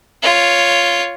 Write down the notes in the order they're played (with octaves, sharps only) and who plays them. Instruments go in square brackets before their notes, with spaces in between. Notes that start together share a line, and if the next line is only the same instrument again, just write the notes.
[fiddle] F4 C#5